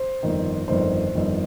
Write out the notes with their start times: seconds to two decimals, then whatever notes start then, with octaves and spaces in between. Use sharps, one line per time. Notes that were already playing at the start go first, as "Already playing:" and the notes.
Already playing: C5
0.23 G1 F2 D#3
0.68 G1 F2 D#3 C5
1.15 G1 F2 D#3